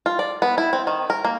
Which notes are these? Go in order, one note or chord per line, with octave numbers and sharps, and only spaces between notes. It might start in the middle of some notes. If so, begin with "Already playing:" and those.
F4
D5
B3
E4
C4
D#3
A#4
A#3